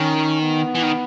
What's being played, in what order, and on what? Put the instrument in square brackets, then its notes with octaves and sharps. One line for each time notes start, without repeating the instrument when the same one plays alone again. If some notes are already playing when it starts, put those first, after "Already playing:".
Already playing: [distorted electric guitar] D#3 [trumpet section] C#4
[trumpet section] B3
[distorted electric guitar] E3
D#3